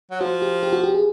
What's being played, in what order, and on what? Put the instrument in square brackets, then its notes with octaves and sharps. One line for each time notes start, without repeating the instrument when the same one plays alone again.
[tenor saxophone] F#3
[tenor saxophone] F3 [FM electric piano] F#4
[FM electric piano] G4
G4
F#4
G4
G#4